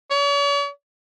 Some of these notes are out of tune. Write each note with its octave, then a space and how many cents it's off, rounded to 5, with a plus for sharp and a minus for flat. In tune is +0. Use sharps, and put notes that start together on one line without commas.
C#5 +45